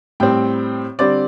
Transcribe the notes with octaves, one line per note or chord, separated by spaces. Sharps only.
A2 G3 C4 G5
D3 G3 C4 D5